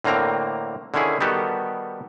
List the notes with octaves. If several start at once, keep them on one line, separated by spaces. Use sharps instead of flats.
A2 D3 A#3 C4 A#5
D3 D#3 C#4 E4 G#4
D#3 G3 B3 F#4 G4 A4